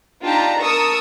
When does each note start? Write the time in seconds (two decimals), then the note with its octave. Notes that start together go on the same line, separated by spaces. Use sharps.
0.23 D4 D#4 F4 G4 A5 A#5
0.60 A#4 A5 C#6 D#6 E6